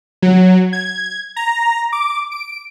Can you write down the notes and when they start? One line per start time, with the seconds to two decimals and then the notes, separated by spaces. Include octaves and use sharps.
0.22 F#3
0.73 G#6
1.36 A#5
1.93 D6
2.31 D7